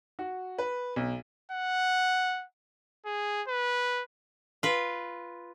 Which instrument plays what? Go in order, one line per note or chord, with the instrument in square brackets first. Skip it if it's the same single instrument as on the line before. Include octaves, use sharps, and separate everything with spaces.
[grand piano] F#4
B4
B1
[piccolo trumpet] F#5
G#4
B4
[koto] F4 B4